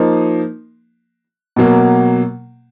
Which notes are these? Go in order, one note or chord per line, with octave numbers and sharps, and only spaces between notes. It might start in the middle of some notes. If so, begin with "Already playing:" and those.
Already playing: F3 A#3 D#4
B2 F#3 A#3